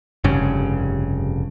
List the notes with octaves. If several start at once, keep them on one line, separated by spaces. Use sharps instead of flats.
F1 G2 C#3